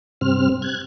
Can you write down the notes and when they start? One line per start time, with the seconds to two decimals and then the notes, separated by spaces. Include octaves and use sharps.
0.21 G2 C3 C4 F6
0.62 F#6 G#6